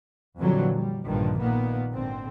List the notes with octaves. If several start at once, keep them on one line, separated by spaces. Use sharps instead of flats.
F2 A#2 D3 E3 F#3 G3
G3
A#1 G2 D3 D#3 F3
A#2 D#3 A#3 B3
G#1 D3 C4